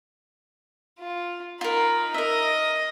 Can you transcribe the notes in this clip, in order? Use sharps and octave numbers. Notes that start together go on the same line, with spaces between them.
F4
D#4 F4 A#4 B5
A#4 D#5 E5